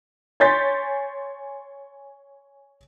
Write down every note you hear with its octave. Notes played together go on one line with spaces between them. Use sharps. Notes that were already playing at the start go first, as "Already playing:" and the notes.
C#5 G#5 C6 G6 A6 B6